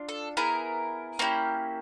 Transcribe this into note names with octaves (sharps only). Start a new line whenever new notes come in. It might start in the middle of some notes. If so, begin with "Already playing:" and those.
Already playing: D4 F4
A4
B3 E4 G#4 A#4
A#3 C#4 E4 G4